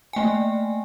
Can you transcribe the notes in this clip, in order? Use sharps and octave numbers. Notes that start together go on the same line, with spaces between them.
A3 A#3 G5 G#5